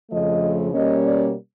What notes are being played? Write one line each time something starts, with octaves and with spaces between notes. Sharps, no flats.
F2 C#3 F3 A3 D#5
B2 G3 A#3 C#4 D#5
D5